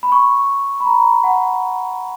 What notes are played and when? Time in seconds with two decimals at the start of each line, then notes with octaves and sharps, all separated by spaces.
0.03 B5
0.12 C#6
0.80 B5
0.86 A#5
1.24 F#5